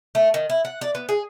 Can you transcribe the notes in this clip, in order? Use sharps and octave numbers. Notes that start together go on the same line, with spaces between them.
A3
D#3
E4
F#5
D5
B3
G#4